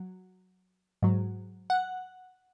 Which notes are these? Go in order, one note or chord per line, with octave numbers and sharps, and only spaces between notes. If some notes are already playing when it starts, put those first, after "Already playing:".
Already playing: F#3
G#2 F#3
F#5